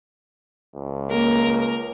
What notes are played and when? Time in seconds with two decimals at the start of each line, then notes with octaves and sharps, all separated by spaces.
0.76 C#2
1.09 A#3 A#4